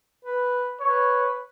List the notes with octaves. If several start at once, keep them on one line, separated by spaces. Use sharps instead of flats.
B4
B4 C#5